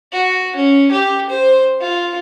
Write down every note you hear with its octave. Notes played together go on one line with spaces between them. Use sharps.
F#4
C#4
G4
C5
F4